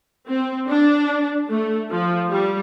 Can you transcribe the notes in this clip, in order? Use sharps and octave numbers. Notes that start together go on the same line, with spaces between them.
C4
D4
A3
F3
G3